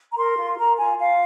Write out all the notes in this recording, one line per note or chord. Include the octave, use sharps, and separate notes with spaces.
A#5
A#4 C6
F4
A#4 A#5
F4 G#5
F4 F5